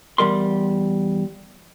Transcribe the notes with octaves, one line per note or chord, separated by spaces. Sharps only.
E2 G3 A#4 C6